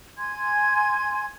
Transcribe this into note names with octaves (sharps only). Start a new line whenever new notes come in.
G#5 C6 G#6